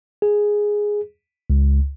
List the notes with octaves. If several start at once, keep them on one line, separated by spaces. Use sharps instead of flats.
G#4
C#2